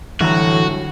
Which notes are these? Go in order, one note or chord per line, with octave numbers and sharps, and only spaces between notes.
A2 D3 E3 F#3 G3 F#4 A#5